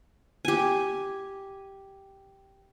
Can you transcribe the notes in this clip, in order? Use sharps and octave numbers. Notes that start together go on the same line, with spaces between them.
G4 G#5